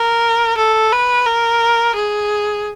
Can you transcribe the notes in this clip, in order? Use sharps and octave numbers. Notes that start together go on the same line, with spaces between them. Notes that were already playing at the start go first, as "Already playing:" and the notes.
Already playing: A#4
A4
B4
A#4
G#4